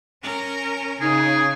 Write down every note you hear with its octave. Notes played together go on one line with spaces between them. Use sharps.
C#4 A#4
C#3 D#4 G#4